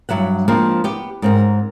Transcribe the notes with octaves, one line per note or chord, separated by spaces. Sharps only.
G2 F#3 E5 F#5
F3 G#3 A#3 C4 D4
B3 G4
G#2 C4 A#4